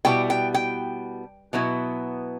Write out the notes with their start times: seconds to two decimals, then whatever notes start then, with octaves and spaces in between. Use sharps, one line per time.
0.05 B2 G3 B3 E4 G5
0.30 G5
0.54 G5
1.53 B2 F#3 B3 E4